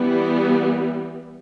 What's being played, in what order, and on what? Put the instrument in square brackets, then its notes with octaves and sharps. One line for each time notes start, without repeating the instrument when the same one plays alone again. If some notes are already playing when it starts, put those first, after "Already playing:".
Already playing: [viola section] E3 G3 B3